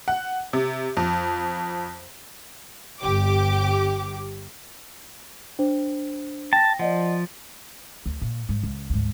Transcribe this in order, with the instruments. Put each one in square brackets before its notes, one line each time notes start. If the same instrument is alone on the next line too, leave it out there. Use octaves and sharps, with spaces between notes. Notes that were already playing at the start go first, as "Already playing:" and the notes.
[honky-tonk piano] F#5
C3
F2
[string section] G1 G4 D6
[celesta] D4 C5
[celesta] G5 A#6 [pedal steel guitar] A5
[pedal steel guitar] F3 [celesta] D5 D#5 F#5
[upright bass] D2
A#2
G#2
C#2
D2 G#2